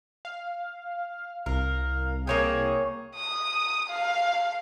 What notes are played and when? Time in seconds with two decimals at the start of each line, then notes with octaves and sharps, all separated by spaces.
0.25 F5
1.46 C2 A#4 F5
2.27 A#3 G#4 C#5 G5
3.15 D#6
3.89 F5